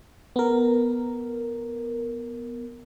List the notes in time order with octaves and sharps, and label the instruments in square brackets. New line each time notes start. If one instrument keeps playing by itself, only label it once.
[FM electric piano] B3 A#4